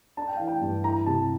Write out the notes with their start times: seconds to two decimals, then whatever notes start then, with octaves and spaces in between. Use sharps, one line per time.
0.17 D4 A5
0.27 G5
0.37 E3 F5
0.47 G5
0.61 G2
0.84 E4 A#5
1.06 C3 A5